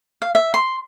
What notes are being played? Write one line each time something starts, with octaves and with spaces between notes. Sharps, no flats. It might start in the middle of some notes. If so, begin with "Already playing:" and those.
F5
E5
C6